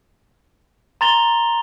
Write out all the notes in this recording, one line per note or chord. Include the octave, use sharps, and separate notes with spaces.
A#5 C6 A6 F7 G7